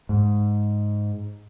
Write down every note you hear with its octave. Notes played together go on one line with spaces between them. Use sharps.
G#2